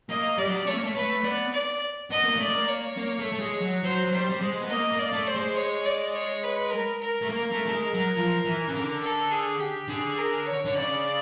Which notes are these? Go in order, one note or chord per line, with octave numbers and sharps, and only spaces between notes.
A#3 D#5
G3 D5
F#3
G3
A3 C#5
A#3
A3
A3 B4
B3 D5
D5
B3 D#5
A#3
A3 D5
A#3
C#5
A#3
A3
A3
G#3
F#3
F#3 C5
F#3
G3 C5
G3
G#3
B3
A#3 D#5
A#3
D5
A3
C5
G#3
C#5
D5
C#5
B4
A#4
A#4
A3
A#3
A3
A3
G#3
F#3
F3
E3
C#3
D3
A4
G#4
G4
D3 G#4
A#4
C#5
D3
C#3 D5